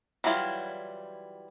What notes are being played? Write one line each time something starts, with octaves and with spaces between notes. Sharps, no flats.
E3 F#3 G3 E4 F4